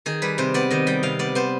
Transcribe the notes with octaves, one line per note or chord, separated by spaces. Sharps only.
D#3 G#4
G3 B4
C3 C5
B3 D5
D#3 D#5
G3 G5
C3 F5
B3 D5
B3 C5